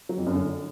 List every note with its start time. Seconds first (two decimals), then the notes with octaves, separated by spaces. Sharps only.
0.09 F#3
0.18 F2
0.26 F#2
0.35 D3